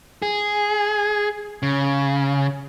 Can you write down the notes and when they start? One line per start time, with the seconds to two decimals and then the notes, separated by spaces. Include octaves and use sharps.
0.22 G#4
1.63 C#3